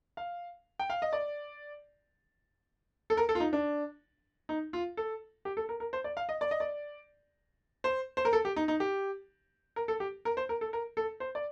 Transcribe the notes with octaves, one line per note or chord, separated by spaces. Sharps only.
F5
G5
F5
D#5
D5
A4
A#4
A4
F4
D#4
D4
D#4
F4
A4
G4
A4
A#4
A#4
C5
D5
F5
D#5
D5
D#5
D5
C5
C5
A#4
A4
G4
D#4
D#4
G4
A#4
A4
G4
A#4
C5
A#4
A4
A#4
A4
C5
D5